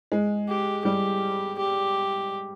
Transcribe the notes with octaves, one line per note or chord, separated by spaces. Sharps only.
G#3
G4
G3 G4
G4